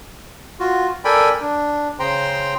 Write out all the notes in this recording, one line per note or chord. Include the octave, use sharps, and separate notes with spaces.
F4 F#4
A4 A#4 D5 G5 G#5 B5
D4
C#3 C5 G5 A#5 C6